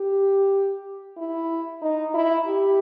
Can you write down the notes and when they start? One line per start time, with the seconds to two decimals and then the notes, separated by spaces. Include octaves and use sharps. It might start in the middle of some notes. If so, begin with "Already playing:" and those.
Already playing: G4
1.18 E4
1.82 D#4
2.14 E4
2.47 G4